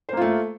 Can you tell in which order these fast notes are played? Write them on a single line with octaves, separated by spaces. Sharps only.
C5 A#3 F4 A3